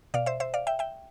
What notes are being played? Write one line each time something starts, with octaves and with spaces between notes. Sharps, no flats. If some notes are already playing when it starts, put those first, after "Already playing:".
B2 D5 F5
C5 E5
C5 E5
D5 F5
E5 G5
E5 G5